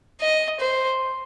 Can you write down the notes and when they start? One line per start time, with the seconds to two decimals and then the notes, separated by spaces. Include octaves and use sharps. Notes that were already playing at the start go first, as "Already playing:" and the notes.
0.21 D#5
0.60 C5